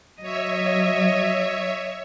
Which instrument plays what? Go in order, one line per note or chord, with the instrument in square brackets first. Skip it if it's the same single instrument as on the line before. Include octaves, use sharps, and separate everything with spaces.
[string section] F#3 [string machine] C#5 E5 [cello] D#5